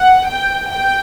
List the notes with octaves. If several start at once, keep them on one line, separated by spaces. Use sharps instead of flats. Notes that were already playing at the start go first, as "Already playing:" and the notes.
Already playing: F#5
G5
G5